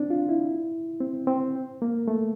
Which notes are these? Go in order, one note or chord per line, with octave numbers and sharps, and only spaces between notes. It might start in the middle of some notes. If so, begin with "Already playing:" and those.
Already playing: C4 D4
F4
E4
C4
C4
A#3
A3